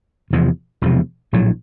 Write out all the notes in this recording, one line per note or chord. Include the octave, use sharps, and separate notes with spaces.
E1 E2 C3 F3
E1 E2 C3 F3
A#1 A2 F#3